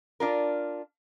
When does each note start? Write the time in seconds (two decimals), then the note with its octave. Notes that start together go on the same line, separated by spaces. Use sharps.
0.20 D4 F4 A#4